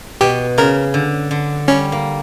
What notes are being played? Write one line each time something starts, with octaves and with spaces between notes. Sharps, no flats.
B2 G4
C#3 A#4
D3
D3
G3 C#4
A#3